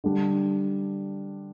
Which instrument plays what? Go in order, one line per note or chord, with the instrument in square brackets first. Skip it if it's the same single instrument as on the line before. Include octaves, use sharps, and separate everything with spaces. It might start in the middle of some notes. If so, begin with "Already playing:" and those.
[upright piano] D3 G3 D4